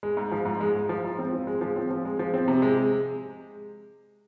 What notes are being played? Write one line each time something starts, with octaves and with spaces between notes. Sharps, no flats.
G#3
G#2
F3
G#2
G#3
G#2
F3
G#2
C4
F3
G#3
F3
C4
F3
G#3
F3
C4
C3
G#3